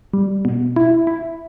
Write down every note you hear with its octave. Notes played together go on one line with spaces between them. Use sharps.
G3
B2
E4
E4